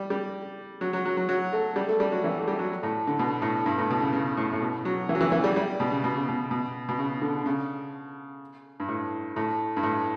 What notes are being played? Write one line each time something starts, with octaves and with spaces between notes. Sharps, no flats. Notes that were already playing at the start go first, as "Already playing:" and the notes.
Already playing: G3
G3
F#3
F#3
F#3
F#3
F#3
A3
G3
A3
G3
F#3
E3
A3
G3
F#3
A2
D3
B2
A2
G2
A2
B2
C#3
C#3
A2
A2
B2
F#3
E3
F#3
E3
E3
G3
G3
B2
C#3
B2
C#3
B2
B2
B2
C#3
D3
C#3
G2
A2
A2
G2
A2